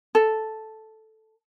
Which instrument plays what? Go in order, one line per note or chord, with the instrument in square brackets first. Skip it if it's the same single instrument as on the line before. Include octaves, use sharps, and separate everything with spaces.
[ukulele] A4